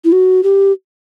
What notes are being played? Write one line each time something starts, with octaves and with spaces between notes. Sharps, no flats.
E4
F#4
G4